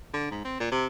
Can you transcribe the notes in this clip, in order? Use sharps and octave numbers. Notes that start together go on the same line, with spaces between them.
D3
G#2
C4
A#2
C3